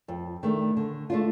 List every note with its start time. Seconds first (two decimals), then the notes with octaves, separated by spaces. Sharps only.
0.08 F2
0.43 D#3 A3 D4
0.77 D3
1.10 A3 D4 F4